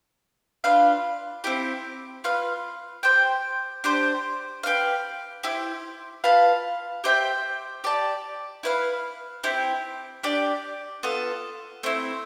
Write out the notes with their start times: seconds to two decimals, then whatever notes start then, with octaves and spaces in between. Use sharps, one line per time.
0.64 D4 F4 B4 F5
1.44 C4 E4 G4
2.24 F4 B4 F5
3.03 G4 C5 G5
3.84 D4 G4 C5
4.63 G4 B4 F5
5.43 E4 G4 C5
6.24 F4 B4 F5 A5
7.04 G4 C5 E5 G5
7.84 G4 D5 A5
8.63 E4 B4 F5
9.44 C4 E4 G4
10.23 D4 G4 D5
11.03 B3 F4 A4
11.83 A3 C4 E4